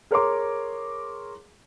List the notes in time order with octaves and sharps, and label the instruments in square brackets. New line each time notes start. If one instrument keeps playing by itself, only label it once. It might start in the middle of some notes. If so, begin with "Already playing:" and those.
[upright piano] G#4 A#4 C#5 A#5 C6 D6